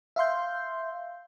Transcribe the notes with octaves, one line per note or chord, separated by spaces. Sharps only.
E5 F5 C6 G6